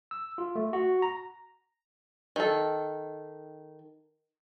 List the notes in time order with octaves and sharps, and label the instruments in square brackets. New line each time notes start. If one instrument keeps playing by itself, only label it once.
[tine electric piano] E6
F4
A3
F#4
A#5
[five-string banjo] D#3 A4